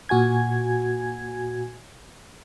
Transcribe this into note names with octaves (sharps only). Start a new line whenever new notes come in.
A#2 F#4 G#5 G#6